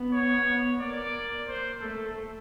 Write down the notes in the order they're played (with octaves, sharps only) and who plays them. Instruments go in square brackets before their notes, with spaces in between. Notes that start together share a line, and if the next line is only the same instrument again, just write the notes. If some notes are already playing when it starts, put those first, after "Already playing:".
Already playing: [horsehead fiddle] B3
[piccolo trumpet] C#5
[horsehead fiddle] B3
[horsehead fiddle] A#3 [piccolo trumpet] D5
[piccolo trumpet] C5
[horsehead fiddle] A3 [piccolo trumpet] A4